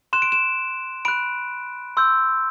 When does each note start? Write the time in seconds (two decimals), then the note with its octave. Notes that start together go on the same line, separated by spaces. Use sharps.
0.13 C6 F#6 E7
0.22 D7
0.32 E7
1.05 B5 F#6 D7
1.97 C6 E6 G6